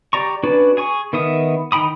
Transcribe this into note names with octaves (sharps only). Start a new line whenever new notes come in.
G4 D5 A#5 C#6
C#4 D4 F#4 B4 D5
G#4 G#5 C#6
D#3 B3 A#4 E5 D#6
D#3 D#4 G5 B5 D#6